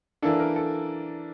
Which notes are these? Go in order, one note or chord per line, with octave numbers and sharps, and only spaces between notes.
E3 A#3 D4 A4
A#4
A4